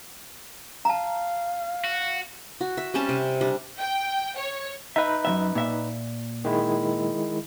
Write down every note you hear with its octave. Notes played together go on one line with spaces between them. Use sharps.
F5 A5 A#5
F#4
F#4
E5
G3 C4 C#4 A5
C3
G3 D4
G5
C#5
D#4 B4 E5
F#2 C#3 E5
A#2 E5
D#3 G#3 E4